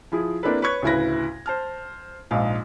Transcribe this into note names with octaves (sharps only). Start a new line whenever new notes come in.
F3 E4 G#4
A#3 C4 D4 E4 A4 B4
B4 C#5 C#6 G#6
D2 A2 C#3 E4 B4 A#6
C5 A5 F6
A#1 G#2 D#4 F5